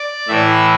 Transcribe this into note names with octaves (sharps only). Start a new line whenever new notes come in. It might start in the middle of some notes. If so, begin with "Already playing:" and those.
Already playing: D5
A2 E3 E5